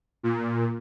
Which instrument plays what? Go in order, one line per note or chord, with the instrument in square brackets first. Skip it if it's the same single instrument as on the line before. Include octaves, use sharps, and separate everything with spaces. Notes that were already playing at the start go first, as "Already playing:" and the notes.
[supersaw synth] A#2